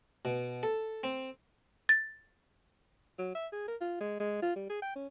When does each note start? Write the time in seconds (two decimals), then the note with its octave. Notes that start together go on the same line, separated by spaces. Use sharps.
0.25 B2
0.63 A4
1.03 C4
1.89 A6
3.19 F#3
3.35 E5
3.52 G#4
3.68 A#4
3.81 F4
4.00 G#3
4.20 G#3
4.42 F4
4.56 G3
4.70 G#4
4.82 G5
4.96 C#4